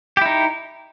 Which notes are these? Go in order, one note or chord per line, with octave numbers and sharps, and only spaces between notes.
D#4 E4 G4